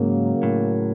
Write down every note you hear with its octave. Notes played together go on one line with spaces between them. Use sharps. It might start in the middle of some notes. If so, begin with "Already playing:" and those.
Already playing: G#2 C#3 F#3 A#3
A2